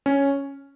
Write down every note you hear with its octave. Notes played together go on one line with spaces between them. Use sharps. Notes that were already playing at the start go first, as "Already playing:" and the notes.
C#4